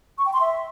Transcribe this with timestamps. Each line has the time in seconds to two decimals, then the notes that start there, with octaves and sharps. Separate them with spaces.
0.18 C#6
0.26 G5
0.33 C6
0.41 E5